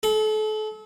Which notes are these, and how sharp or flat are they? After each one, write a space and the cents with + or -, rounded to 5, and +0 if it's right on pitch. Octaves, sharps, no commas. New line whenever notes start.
A4 -35